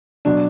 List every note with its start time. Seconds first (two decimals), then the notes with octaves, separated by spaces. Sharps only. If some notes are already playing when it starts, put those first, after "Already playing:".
0.25 B2 F#3 D4